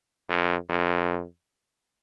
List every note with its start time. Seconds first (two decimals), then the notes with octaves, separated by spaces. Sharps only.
0.29 F2
0.70 F2